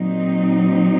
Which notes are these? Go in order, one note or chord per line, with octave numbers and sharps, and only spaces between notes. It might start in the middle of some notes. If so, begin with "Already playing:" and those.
Already playing: A#2 F#3 C4 D#4